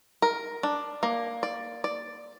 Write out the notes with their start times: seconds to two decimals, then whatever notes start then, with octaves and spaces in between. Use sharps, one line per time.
0.22 A#4
0.63 D4
1.03 A#3
1.43 D5
1.84 D5